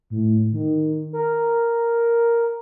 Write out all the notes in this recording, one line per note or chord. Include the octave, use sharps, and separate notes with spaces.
A2
D#3
A#4